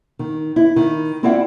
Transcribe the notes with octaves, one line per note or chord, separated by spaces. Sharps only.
D#3
E4
D#3
C4 E4 F4 D5 E5 F#5